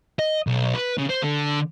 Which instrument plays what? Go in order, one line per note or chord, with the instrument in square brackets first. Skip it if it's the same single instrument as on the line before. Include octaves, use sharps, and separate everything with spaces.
[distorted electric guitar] D#5
B1
B4
C#3
C5
D3